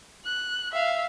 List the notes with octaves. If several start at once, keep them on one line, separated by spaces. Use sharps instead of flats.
F#6
E5 F5